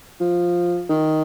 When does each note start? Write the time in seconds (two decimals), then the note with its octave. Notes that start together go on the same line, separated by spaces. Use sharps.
0.21 F3
0.89 D#3